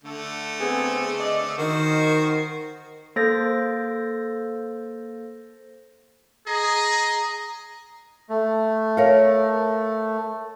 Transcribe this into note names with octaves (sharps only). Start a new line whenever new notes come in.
D3 A3
B3 C4 G#4
D5 D#5
D#3 F#4 C5
A#3 A4 C5 A6 A#6
G#4 D#5 A#5
A3
A#4 C#5 F5